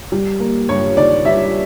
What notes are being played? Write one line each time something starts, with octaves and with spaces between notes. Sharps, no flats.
G3
A#3
G2 C#5
D#3 D5
G3 E5